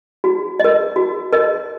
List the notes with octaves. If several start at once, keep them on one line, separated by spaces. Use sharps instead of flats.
F#4
A#4 D#5
F#4
A#4 D#5